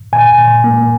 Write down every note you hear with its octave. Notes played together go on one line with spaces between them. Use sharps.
A#2 G#5
A#2
A#3